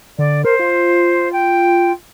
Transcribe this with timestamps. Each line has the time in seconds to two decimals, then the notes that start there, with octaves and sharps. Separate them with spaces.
0.18 D3 D5
0.45 A#4 C5
0.59 F4
1.33 G5